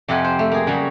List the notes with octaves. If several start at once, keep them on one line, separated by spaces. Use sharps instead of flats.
F2 C3 G4 F#5 G#5
C5
A3
A#3 G#4
C#3 F#3 G3